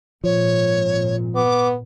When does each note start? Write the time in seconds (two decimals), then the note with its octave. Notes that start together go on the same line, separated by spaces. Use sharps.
0.24 G#1 A#2 F3 C#5
1.35 B3 D6